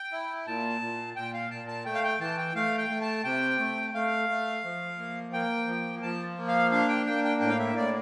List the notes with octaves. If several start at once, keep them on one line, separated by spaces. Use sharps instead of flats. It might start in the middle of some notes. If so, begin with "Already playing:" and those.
Already playing: G5
E4
A#2 A5
A#2
A#2 G5
F5
A#2 A5
A5
A3 G5
F5
G5
E3 A5
G5
A3 F5
G5
A3
A5
C3 G5
A3
A3 F5
A3
F3
A#3
A#3 G5
F3
F3 A5
A#3
F5
D4 F5
G5
A#3 G5
G5
A2 G5
F5
E5
A2 D5